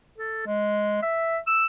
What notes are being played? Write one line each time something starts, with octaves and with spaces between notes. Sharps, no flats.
A4
G#3
E5
E6